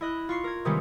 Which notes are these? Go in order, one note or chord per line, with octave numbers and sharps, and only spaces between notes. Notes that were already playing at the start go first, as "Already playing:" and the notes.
E4 D#5 F#6
F4 C#6 C7
A#4 G#6
C3 D#3 G3 G#3 B3 C#4